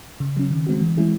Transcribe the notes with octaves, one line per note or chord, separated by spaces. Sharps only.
C#3
F#3 C#4
D#3
G#3 C4 F#4
E3
G#3 C#4 E4 G#4